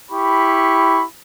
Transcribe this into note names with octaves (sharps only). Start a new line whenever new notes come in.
E4 G4 B5 C#6